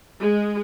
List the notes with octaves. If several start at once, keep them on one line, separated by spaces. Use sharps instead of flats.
G#3